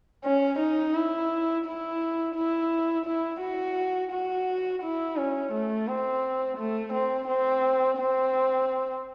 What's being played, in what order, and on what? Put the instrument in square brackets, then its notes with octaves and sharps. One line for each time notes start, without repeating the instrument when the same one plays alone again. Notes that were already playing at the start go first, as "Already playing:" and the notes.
[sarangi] C#4
D#4
E4
E4
E4
E4
F#4
F#4
E4
C#4
A3
C4
A3
C4
C4
C4